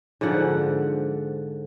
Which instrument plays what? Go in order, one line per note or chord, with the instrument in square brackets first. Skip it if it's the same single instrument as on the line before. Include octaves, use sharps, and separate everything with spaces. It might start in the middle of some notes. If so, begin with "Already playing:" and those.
[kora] G#2 D3 F3 F#5